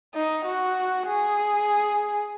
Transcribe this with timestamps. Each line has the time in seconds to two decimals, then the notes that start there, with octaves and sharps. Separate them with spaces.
0.15 D#4
0.46 F#4
1.07 G#4